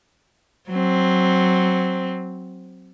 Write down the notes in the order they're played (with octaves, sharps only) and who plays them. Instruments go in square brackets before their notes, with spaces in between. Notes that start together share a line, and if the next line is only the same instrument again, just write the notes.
[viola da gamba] F#3 C4